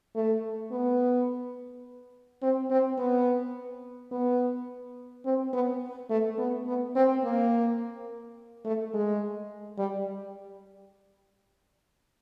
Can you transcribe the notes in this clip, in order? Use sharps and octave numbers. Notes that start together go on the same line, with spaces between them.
A3
B3
C4
C4
B3
B3
C4
B3
A3
B3
B3
C4
A#3
A3
G#3
G3